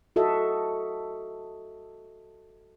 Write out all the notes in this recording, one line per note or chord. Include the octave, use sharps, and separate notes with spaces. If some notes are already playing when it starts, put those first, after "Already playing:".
F#4 A4 D#5 E5